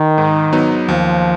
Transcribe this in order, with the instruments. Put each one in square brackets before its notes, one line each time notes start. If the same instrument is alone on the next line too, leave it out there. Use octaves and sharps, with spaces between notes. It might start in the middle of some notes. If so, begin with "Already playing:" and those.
Already playing: [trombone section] D#3
[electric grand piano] G#2
F#3 B3 D#4
[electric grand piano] D#2 [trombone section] F3